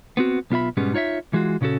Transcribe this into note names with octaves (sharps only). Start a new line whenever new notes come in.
B3 C4 F#4
B1 B3 F4 E5 B5
G#2 B2 G3 G#3 B3 C#4
D#4 F4 C#5 D#5 E5
E3 G#3 F4 F#4
A#2 C#3 C#4 F#4 A4